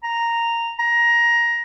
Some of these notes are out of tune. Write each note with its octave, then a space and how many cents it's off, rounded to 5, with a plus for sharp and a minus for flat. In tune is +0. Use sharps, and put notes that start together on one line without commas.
A#5 -5
A#5 +15